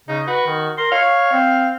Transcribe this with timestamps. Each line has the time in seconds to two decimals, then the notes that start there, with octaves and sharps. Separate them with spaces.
0.08 C#3 D#4
0.27 F#4 B4
0.46 D#3
0.78 A#4 C6
0.92 C#5 F5
1.32 C4